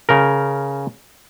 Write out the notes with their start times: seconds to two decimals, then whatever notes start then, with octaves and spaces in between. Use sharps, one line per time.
0.09 C#3 A#4